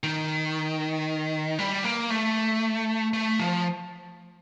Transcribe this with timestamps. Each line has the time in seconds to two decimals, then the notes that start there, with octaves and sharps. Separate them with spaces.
0.03 D#3
1.59 G3
1.84 A#3
2.10 A3
3.13 A3
3.39 F3